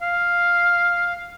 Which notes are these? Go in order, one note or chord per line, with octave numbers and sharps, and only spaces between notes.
F5